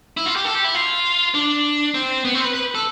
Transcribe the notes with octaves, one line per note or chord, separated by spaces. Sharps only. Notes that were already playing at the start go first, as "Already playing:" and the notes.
E4
F4
G4
A4
G4
E4
F4
D4
C4
B3
C4
C5
B4
B4
A4